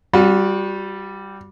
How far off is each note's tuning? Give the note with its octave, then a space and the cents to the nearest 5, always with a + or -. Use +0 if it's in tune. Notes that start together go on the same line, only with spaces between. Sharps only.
G3 -5 F#4 -40